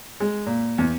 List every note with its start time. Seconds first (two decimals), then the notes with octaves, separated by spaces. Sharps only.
0.20 G#3
0.46 A#2
0.78 E2